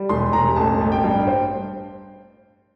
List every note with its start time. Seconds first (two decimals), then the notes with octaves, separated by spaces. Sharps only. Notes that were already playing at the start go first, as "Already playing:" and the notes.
Already playing: G3
0.09 E1 C6
0.33 E1 A#5
0.56 A1 A5
0.80 A1
0.92 G5
1.04 G2
1.27 C5